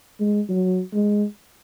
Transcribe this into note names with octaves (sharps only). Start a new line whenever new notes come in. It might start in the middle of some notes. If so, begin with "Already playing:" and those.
G#3
F#3
G#3